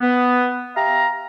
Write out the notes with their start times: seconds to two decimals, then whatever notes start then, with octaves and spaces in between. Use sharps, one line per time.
0.01 B3
0.76 G4 E5 F5 A#5